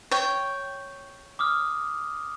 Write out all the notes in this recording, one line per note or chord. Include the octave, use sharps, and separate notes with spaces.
C#5 G5
D6 D#6 F6